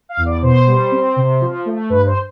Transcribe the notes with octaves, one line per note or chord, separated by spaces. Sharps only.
F5
E2
D5
B2 C5
G3
C4
C3
F3
A3
G2 B4
C5